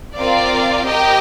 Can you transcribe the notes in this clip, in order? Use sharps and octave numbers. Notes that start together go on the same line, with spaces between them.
C4 F4 A#4 D5 F5
G4 A#4 D#5 G5